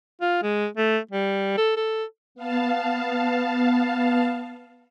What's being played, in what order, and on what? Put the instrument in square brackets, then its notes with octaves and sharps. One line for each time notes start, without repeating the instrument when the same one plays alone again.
[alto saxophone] F4
G#3
A3
G3
A4
A4
[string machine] B3 F5 A5